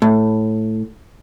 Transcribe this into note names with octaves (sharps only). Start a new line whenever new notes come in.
A2